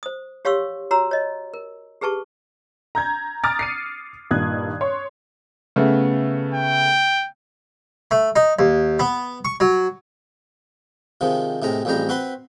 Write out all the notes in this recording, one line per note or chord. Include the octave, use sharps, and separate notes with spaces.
C5 D#6
G4 C#5 F5 C6 C#6 E6
F#4 C#5 A#5 C6 E6
C#5 D#5
A#4
G4 G#4 B4 A5 C#6
A#5 G6 G#6
A#5 D6 D#6 F6 A6 D7
C7 C#7 D#7
G2 A#2 D#3 D#6 F#6 G#6
C#5 C6
C#3 A3 B3
G5
A3
D#4
D#2
B3
C#6
F#3
C3 D#3 F3 G#3
A2 C3 G#3 A#5
A1 F2 G3 G#3 C5 A#5
C4 F#4 B4 B5 C6